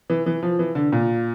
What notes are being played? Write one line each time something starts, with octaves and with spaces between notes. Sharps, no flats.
E3
E3
F3
E3
D3
A#2